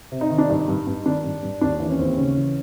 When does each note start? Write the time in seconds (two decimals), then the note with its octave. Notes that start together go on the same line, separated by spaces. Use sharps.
0.12 C3
0.21 D#4
0.30 D#3
0.38 D4
0.49 G2 D#4
0.68 G2
0.87 G2
1.05 D#3 D4
1.24 G2
1.43 G2
1.61 D#2 D4
1.80 E3
1.90 C#4
1.99 D#2 C4
2.17 C#3 C#4
2.36 E3